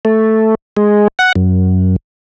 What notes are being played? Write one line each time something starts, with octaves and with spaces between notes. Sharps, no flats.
A3
G#3
F#5
F#2